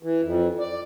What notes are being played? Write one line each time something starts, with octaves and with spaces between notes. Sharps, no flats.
E3
F2
D5